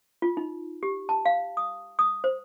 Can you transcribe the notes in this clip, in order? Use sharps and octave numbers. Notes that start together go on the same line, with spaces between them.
F4
D#4
G4
A5
F5
D#6
D#6
C5